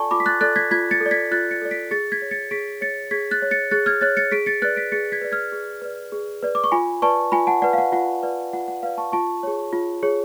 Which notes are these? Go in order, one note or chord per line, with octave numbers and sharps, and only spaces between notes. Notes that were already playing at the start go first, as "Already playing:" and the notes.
Already playing: F4 A4 D5 G#5 A5 B5 C#6
F4 B5 D6
B6
F#6 A6
A4 D5 F#6 A6
G#6 B6
F4 G#6 B6
A6 C#7
A4
D5
G#6 B6
F4 F#6 A6
A6 C#7
A4 D5
B6 D7
G#4 A6 C#7
G#6 B6
C#5
A6 C#7
G#4 B6 D7
C#5 A6 C#7
G#4 G#6 B6
F#6 A6
C#5
A6 C#7
G#4 F#6 A6
F6 G#6
C#5 F#6 A6
A6 C#7
G#4 B6 D7
A6 C#7
B4 D5 F#6 A6
B6 D7
G#4 A6 C#7
G#6 B6
B4 D5
F6 G#6
G#4
B4 D5
G#4
B4 D5
D6
C#6
F4 G#5 B5
B4 D5 A5 C#6
F4 G#5 B5
F#5 A5
B4 D5 F#5
F5
F#5
F4 F#5
B4 D5
F4 F#5
F#5
B4 D5 F5
A5 C#6
F4 A5 C#6
G#4 C#5
F4
G#4 C#5